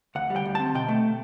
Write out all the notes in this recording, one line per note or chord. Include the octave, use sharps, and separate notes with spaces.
D2 F#5
G3
G5
D2
C4 A5
B2 G5
A3